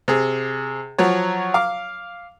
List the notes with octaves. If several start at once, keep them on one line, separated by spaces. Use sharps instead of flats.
C3 G#4
F3 F#3 C#5
F5 D6